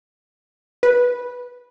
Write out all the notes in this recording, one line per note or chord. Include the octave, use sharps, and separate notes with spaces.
B4